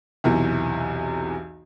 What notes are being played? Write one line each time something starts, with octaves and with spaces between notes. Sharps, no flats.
B1 E2 C3 E3